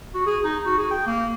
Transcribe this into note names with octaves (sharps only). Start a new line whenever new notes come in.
F#4
G#4
D#4
F#4
G#4
G5
A#3